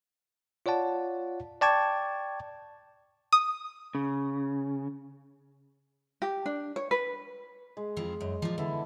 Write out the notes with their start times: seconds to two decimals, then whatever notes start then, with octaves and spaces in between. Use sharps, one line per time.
0.66 F4 C#5 D5 F#5 A5
1.61 D5 G5 A5 C#6 D6 G#6
3.33 D#6
3.95 C#3
6.22 G4
6.46 D4
6.76 C#5
6.91 B4
7.77 G#3
7.96 F2 F3 E4
8.21 F#2 D#5
8.42 A#2 F3 D5
8.58 D3 B3 E4 A4